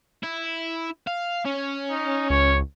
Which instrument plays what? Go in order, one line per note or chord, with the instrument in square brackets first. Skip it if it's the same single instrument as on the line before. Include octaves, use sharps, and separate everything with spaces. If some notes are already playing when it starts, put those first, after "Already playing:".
[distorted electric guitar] E4
F5
C#4
[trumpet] D#4
[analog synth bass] C#2 [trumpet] C#5